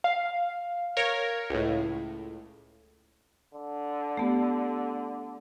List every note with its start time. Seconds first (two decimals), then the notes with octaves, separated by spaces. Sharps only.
0.04 F5
0.97 A#4 C#5
1.50 C#2 A2
3.54 D3
4.17 A3 B3 G4